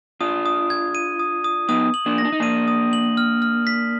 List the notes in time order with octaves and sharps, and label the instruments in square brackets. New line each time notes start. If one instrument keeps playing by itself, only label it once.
[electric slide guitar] D4 F4 [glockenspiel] D#6
[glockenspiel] D#6
G#6
D#7
D#6
D#6
[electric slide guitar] B3 D#4 [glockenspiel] D#6
[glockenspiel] F#7
[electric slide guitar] A#3 D4
[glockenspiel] A#6
[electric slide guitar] D4
D#4
[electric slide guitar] A#3 D4 [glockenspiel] D#7
[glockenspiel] D#6
F#7
F6
F6
B6